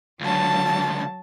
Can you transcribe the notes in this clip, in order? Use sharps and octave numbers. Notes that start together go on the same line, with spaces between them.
C#2 D3 F#3 A5